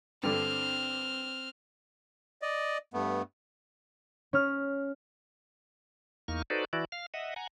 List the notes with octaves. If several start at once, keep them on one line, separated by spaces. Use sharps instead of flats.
G2 D3 C4 F6
D5 D#5
G2 A3 B3
C#4 F6
E2 A#3 D#4 C#6 F6
D#4 F#4 A4 B4 C5 D5
E3 E4 F#4 D5
F5 F6
D#5 E5 F#5
F#5 G#5 A#5